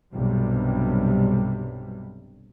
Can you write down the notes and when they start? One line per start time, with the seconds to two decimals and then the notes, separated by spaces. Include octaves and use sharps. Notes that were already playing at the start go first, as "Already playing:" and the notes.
0.12 B1 G2 C3 G3